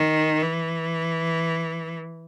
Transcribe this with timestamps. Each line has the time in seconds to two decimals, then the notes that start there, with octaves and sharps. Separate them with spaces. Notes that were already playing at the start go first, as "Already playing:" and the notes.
Already playing: D#3
0.42 E3